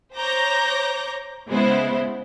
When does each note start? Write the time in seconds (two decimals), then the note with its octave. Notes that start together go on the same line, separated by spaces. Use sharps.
0.18 C5 C#5 A#5 D6 G6 A#6
1.48 C#3 G#3 B3 E4 C5